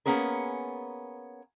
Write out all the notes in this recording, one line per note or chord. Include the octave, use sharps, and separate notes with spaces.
A#3 B3 C#4 G#4 A#4